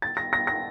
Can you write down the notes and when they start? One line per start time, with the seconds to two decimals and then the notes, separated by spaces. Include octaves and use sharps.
0.02 A6
0.17 A#6
0.33 A#6
0.47 A#6